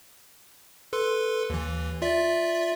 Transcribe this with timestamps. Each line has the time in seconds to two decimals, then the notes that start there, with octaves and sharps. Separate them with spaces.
0.93 A4 B4 C6
1.50 D#2 E3
2.02 F4 D5 E5